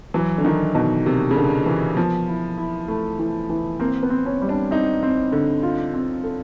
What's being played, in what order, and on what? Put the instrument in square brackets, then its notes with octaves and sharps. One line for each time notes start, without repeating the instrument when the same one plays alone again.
[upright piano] E3 [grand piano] F#3
[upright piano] D3
[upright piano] D#3 [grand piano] D#4
[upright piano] B2 [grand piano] D#4
[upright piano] C3 [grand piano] A#3
[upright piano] C#3
[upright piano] D3 [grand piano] A#3
[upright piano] E3 [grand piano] A#3
[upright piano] F3 [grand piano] B3
[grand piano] E4
E4
[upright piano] A3 [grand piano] E4
[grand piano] E3
E3
[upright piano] A#3 [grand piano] C4
[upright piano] B3
[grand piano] C4
[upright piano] C#4
[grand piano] G3
[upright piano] D4
[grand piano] C4 [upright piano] D#4
[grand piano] C4
D3
F4
C4
A4